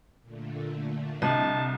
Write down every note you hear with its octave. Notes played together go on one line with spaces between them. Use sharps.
A#2 D3 A3
C2 D4 D#5 A5